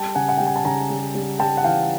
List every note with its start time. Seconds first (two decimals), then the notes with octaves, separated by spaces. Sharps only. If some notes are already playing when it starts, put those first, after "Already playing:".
Already playing: G3 G5 A5
0.15 C#3 F#5 G#5
0.28 F#5
0.37 G3 G5
0.47 G#5
0.56 A5
0.65 C#3 G#5 A#5
0.90 G3
1.15 G3
1.39 G3 G5 A5
1.57 F#5
1.64 E3 F5 G5